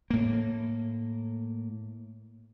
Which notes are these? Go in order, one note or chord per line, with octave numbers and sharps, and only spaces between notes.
A2 A#3